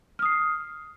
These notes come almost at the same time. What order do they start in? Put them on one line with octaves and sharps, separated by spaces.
F6 D#6 C7